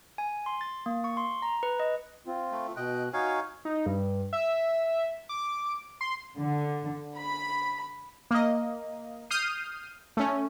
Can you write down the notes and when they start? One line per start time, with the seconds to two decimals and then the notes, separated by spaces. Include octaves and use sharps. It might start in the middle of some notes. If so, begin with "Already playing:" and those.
0.18 G#5
0.46 C6
0.61 A6
0.86 A#3
1.04 C#6
1.17 C6
1.42 A#5
1.63 B4
1.80 D#5
2.27 C4 F4
2.52 A3
2.77 B2 D#5 G5 F#6
3.13 D#4 F#4 C#5 F5 G#5
3.65 D#4
3.86 G2
4.33 E5
5.29 D6
6.01 C6
6.37 D3
7.18 B5
8.31 A#3 D#5
9.30 D#6 F6 G6 C7 D#7
10.17 A3 C#4